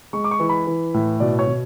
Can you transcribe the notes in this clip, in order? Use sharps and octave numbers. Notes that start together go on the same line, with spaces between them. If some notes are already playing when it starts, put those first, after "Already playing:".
G#3 C#6
D6
C#6
E3
B5
E3
A2
B2 D5
C#5
B2